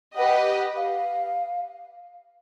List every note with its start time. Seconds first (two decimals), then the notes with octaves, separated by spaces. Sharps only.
0.16 G4 B4 D#5 F#5
0.76 F5